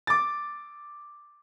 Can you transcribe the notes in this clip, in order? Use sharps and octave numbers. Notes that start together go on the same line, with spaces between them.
D6 A6